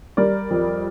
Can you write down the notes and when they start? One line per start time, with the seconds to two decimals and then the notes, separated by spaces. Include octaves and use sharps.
0.17 G3 A#4 D5
0.50 F2